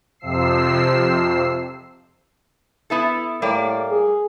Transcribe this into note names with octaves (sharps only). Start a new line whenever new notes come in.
F2 C3 F3 E6 C7
B3 E4 A4
A2 G3 A#3 D5
G#4